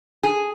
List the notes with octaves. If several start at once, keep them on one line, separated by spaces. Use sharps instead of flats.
G#4